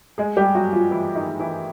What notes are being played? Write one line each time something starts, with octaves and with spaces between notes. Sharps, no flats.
G#3 G#4
G3 G4
F#3 F#4
F3 F4
E3 E4
D#3 D#4
E3 E4